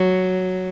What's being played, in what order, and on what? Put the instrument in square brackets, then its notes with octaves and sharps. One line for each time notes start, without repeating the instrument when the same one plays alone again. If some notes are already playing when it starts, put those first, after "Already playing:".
Already playing: [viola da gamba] F#3